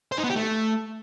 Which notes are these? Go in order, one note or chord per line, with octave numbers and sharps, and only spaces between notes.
C5
D#4
B3
G4
A3